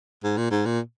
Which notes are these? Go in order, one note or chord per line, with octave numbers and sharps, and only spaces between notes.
G#2
A#2
G#2
A#2